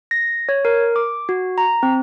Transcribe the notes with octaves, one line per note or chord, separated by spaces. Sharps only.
A#6
C#5
A#4
D6
F#4
A#5
C4